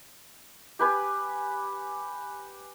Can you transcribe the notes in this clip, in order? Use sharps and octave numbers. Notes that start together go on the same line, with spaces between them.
G4 B4 G#5